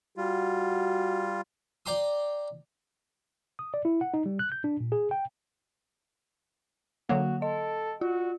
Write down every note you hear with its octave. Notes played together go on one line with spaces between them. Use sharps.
G3 F4 F#4
D5 G5 A#5 C6 D#6
D#6
D5
E4
F#5
D#4
G3
F#6
G6
D4
A#2
G#4
G5
D3 F#3 A#3 F#4 F#5
A4 D#5
F4 F#4